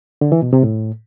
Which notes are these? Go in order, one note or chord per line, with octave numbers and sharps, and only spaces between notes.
D3
E3
B2
C3
A2